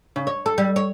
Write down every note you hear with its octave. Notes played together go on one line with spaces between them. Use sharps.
C#3
C#5
A4
G3
C#5